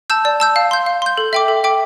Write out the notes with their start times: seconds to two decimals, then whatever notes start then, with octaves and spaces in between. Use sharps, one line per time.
0.10 A5 E6 G6
0.25 D5
0.40 A5 E6 G6
0.56 F5
0.71 C6 G6
0.86 F5
1.02 C6 G6
1.17 A4
1.33 E5 G5 D6
1.48 A4
1.64 E5 G5 D6